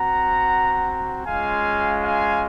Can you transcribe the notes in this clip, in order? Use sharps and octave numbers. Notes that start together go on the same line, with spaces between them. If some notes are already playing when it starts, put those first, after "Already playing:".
Already playing: C4 F#4 F#5 A#5
G#3 C#4 F4 F5 G#5
F5 G#5